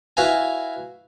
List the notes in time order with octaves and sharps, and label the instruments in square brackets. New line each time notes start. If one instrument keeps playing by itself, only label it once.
[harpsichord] E4 F#4 B4 F5 G#5